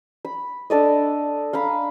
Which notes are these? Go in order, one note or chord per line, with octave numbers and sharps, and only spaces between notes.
B5
D4 A4 D5 D#5
F5 A#5 B5